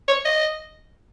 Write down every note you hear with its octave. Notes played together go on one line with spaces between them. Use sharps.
C#5
D#5